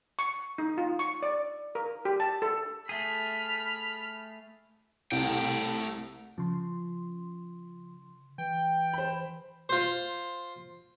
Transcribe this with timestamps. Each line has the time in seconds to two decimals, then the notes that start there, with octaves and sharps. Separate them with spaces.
0.19 C#6
0.58 D#4
0.78 F4
0.99 C#6
1.22 D5
1.75 A#4
2.05 G4
2.20 A5
2.42 A4
2.89 A3 G#4 B5 F6
5.12 C2 A3 G5
6.38 C#3 F3 C6
8.38 E3 G5
8.93 C5 B5
9.69 F4 C5